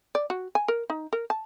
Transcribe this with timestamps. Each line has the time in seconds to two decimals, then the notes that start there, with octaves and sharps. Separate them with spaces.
0.15 D5
0.30 F#4
0.55 G#5
0.68 A#4
0.90 D#4
1.13 A#4
1.30 A5